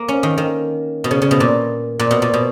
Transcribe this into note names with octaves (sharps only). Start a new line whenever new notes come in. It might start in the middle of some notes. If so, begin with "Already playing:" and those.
Already playing: A#3
C#4
D#3
D#3
B2
C#3
C#3
B2
A#2
A#2
B2
A#2
B2